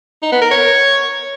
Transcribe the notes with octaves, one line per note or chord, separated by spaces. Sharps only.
D#4
B3
A#4
C#5